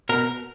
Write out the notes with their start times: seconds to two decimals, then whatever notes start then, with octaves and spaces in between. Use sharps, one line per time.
0.09 B2 A#4